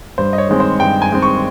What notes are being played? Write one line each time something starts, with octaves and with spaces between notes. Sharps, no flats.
G2 C5
D#5
C#5
D#3 G#3 C4
C5
G2 G5
G#5
D#3 G#3 C4
C#6